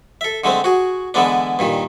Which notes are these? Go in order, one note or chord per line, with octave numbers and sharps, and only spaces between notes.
A4 E5
D3 G#3 A3 C4
F#4 G#4
D3 E3 G#3 B3 D4
G2 A#2 D#3